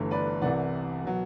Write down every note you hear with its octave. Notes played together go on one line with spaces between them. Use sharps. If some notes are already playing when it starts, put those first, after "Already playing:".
Already playing: G1 G2 E3 A3
B4 D5
C2 C3 E3 D5 F#5
B2 F#3